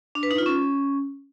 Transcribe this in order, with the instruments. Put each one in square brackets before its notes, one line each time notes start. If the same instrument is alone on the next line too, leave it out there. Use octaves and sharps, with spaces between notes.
[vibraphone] D4
B4
D#4
F4
C#4